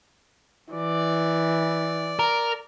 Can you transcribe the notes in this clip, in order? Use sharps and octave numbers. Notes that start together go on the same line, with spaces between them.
E3 D5
A#4